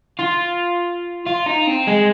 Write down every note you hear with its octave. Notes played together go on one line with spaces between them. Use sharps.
F4
F4
D#4
C4
G#3